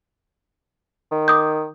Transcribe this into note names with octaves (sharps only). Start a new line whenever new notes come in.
D#3
D6 D#6 G6